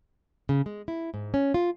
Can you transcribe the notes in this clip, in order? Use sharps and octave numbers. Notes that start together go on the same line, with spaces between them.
C#3
G#3
E4
G#2
C#4
F4